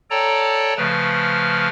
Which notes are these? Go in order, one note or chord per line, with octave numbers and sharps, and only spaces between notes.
A4 C#5 D5 G5 A5 A#5
C#3 F3 A3 B4 F6